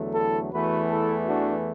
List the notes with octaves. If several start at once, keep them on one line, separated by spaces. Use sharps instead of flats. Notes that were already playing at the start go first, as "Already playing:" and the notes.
Already playing: E2 D3 F#3 A3
E4 A4
E2 E3 A3 F#4 B4
E4 A4
D4 F#4